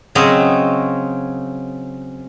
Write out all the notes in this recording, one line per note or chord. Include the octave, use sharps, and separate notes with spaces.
C#3 F#3 C4 C#5 D#5 G5